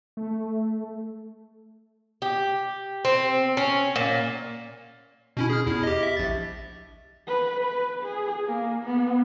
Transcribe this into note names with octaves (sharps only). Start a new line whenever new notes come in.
A3
G4
C4
C#4
A#2
B2 C#4 E4
G#4 F6
E2 E4
G4 D#5
E5
A#1 A6
B4
B4
G#4
A#3
B3